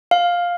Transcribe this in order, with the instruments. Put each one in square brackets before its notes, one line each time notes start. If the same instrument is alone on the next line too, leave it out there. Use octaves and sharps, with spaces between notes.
[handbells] F5